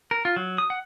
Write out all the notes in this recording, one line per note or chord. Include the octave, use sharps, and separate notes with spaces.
A#4
F4
F#3
D#6
F#5